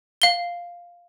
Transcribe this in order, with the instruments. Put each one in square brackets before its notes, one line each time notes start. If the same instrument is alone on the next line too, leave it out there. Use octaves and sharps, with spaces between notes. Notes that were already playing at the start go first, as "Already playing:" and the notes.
[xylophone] F5 G7